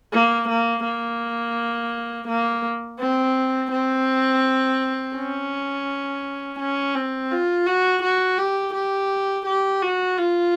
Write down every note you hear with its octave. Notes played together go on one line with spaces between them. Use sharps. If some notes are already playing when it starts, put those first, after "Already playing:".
A#3
A#3
A#3
A#3
C4
C4
C#4
C#4
C4
F4
F#4
F#4
G4
G4
G4
F#4
F4